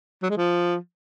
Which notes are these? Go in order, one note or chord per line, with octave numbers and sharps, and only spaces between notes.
F#3
G#3
F3